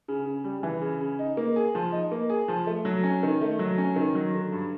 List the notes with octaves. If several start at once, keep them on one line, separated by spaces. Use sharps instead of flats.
C#3
C#3
G3
E3
C#3
C#3
D#4
A#3
G#4
F3
D#4
A#3
G#4
F3
A3
F#3
C#4
D#3
A3
F#3
C#4
D#3
F#3
D3
G2